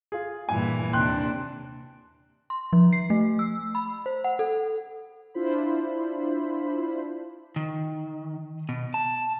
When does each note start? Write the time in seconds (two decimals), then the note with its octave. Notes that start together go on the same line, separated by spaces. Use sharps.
0.12 F4 G#4
0.49 G2 A#2 E3 G#5
0.93 D#2 C3 D4 G5 C6 F#6
2.50 C6
2.73 F3
2.93 C7
3.10 A3
3.39 E6
3.75 B5
4.06 C5
4.24 F#5
4.39 A4
5.34 D4 E4 F4 C5 B5
7.56 D#3
8.69 B2
8.94 A5